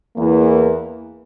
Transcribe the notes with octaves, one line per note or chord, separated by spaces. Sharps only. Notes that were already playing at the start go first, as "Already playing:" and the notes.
E2 E3 A#3